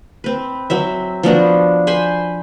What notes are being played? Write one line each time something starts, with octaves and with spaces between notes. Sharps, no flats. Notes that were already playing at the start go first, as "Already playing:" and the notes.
C4 B4
F#3 C4 E5
F3 B3 D4 F#4
C5 G#5 B5 C6